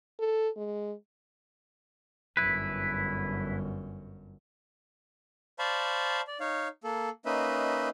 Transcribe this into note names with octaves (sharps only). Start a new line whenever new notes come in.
A4
G#3
G1 F#2 E4 B4
C5 D5 F5 A5 B5 C#6
D5
D#4 C#5 F5
A#3 A4
A#3 C#4 D#4 B4 D#5 E5